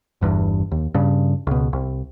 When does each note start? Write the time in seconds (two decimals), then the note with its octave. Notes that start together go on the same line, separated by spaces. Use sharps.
0.21 G1 E2 G2
0.71 D#2
0.94 G2 C#3
1.47 C#2 B2
1.73 C2